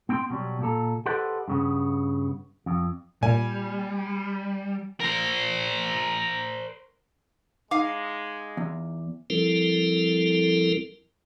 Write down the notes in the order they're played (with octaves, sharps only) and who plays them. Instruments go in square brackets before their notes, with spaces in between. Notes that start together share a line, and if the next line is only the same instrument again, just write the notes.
[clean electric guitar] B3 C4 G5 A#5 C6
B2 F#3 G3
A#2 A4 A#5
G4 A4 B4 C5 D#5 F#5
G2 C#3 B3
F2
[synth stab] A#2 [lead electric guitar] G3 [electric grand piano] G#5
[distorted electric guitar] A#4 C5
[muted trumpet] G#3 [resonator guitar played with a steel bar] D#4 F5 [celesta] D6
[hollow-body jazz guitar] E2
[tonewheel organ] F3 G3 C4 E4 A4 A#4